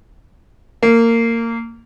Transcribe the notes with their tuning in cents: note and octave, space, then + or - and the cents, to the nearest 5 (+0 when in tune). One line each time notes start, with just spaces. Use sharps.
A#3 -20